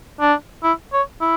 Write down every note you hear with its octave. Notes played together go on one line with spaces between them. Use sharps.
D4
E4
C#5
E4